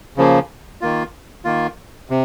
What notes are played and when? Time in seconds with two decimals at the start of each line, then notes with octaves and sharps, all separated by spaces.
0.17 C#3 F3 A#3
0.81 D#3 A#3 F4
1.45 D#3 A#3 F4
2.10 C3